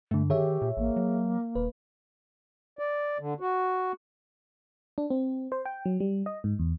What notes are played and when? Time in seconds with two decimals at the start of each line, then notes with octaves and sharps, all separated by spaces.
0.11 G2 D3 A3
0.30 D#3 G4 G#4 C#5 E5
0.62 A#2
0.77 A1 A#3
0.96 F#3
1.55 D#1 B4
2.79 D5
3.19 D3
3.40 F#4
4.98 D4
5.10 C4
5.52 C5
5.65 G5
5.85 F#3
6.00 G3
6.26 D#5
6.44 G#2
6.59 E2